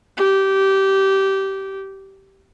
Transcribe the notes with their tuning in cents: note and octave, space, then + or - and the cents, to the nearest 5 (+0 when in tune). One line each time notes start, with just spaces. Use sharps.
G4 -20